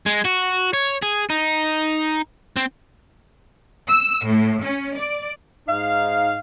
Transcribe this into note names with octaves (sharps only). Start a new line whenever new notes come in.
G#3
F#4
C#5
G#4
D#4
C4
E6
A2
C#4
D5
G#2 D#4 F5